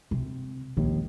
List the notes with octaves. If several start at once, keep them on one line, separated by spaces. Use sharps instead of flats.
C3
A#1 D#2 G#3